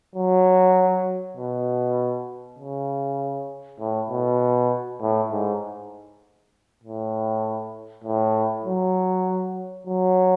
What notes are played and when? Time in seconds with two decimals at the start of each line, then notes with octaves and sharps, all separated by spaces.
0.15 F#3
1.37 B2
2.59 C#3
3.80 A2
4.10 B2
5.01 A2
5.31 G#2
6.84 A2
8.04 A2
8.65 F#3
9.87 F#3